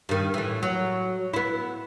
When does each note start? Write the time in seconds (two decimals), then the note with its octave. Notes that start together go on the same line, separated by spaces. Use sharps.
0.09 G2 D#3
0.34 A2 E3
0.63 F#3
1.34 B3 E4